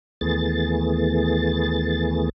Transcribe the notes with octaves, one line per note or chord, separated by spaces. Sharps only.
D#2 E3 A3 B3 G#4 A6